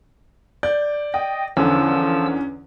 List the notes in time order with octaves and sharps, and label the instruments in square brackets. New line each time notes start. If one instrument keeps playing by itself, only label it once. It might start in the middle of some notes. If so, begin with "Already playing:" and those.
[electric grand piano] D5 [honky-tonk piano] G6
[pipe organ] D#5 [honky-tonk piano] G5
[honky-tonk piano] E2 D3 [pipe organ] F3 E6 [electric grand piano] C#4